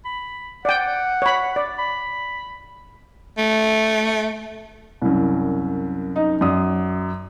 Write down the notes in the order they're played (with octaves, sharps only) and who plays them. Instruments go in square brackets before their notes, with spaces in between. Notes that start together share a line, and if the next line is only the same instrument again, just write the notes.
[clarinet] B5
[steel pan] D5 G5 [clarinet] F#5
[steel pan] C#5 B5
D5
[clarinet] B5
[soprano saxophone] A3
[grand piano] C2 F#2
[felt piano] D#4
[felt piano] F#2 [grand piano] D5 D#6